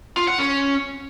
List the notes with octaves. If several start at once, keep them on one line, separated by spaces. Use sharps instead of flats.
F4
F#5
C#4